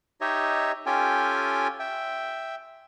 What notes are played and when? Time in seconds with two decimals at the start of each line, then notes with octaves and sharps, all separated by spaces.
0.21 D#4 G4 C#5 D#5 E5
0.86 C#4 F4 G4 A4 G5 G#5
1.79 E5 G5